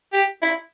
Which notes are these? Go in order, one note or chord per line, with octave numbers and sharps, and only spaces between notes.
G4
E4